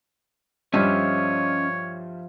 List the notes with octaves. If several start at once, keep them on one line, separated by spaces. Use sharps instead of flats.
G2 F3 G3 C#4 F4 C#5 D#5 E5